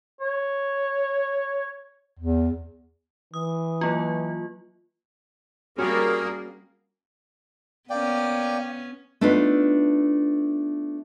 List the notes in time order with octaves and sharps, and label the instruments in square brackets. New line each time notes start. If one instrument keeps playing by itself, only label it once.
[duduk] C#5
[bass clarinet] E2
[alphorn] E3 [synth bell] D#6
[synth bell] F#3 A#3 F4
[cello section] G3 A#3 [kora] C#4 F#4 C#5 [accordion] G#4 A#4
[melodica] A#3 D5 G5 [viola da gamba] B3 C#4
[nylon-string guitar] A3 B3 D4 D#4 F4 B4